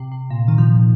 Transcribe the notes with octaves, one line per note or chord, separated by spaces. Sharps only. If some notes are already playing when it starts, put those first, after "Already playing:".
Already playing: C3
C3
A#2
D#3
F3